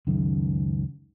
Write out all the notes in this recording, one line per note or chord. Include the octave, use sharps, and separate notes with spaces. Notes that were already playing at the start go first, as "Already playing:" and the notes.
C#2 F#2 D#3